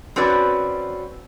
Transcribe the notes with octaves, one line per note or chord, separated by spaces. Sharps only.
C4 C#4 F#4 B4 D5